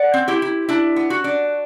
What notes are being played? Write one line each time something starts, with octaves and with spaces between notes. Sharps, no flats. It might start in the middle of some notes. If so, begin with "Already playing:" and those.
Already playing: D5 F#5
C4
E4 G4
E4
D4 E4
B3
F#4
D4